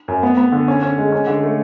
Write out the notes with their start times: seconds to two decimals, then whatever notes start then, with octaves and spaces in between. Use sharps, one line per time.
0.08 F#2
0.23 B3
0.37 B3
0.52 D3
0.68 C#4
0.83 C#4
0.98 G#3
1.12 C#4
1.27 D3
1.43 A3